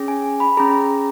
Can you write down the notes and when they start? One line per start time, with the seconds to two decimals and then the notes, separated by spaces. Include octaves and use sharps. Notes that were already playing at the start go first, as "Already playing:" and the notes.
Already playing: C#4 G#4
0.08 G#5
0.40 B5
0.57 C#4 G#4 A#5